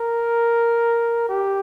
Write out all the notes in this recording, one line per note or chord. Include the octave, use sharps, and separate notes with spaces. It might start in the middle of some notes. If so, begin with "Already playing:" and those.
Already playing: A#4
G4